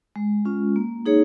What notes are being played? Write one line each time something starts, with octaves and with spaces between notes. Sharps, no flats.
G#3
C#4 F4
A#3
D#4 G#4 C#5